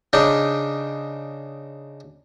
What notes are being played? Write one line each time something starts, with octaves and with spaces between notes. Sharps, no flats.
C#3 D4 D#4